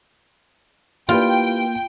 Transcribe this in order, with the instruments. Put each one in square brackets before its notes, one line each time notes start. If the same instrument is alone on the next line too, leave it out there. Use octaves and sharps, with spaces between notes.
[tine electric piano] A#3 [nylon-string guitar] E4 G4 B4 [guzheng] F4 [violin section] G5